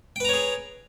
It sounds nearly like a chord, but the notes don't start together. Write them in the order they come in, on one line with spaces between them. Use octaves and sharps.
G5 B4 A#5 C#5 G#4